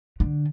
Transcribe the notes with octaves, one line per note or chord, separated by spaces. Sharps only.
D3